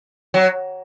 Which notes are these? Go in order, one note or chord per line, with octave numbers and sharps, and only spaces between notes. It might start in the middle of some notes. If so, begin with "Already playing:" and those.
F#3